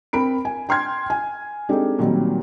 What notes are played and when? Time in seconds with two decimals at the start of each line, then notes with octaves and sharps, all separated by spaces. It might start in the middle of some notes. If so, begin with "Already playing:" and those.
0.13 C4 A#4 B5 D7
0.45 G#5
0.69 G5 C6 F6 G#6
1.10 G#5
1.69 G#3 C4 D4 D#4 G4 A4
1.99 A#2 D#3 F#3 G3 B3 C4